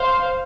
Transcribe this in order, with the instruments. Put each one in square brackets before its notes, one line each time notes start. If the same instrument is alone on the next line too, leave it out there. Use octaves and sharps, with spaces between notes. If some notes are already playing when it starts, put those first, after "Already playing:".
Already playing: [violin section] C5 F5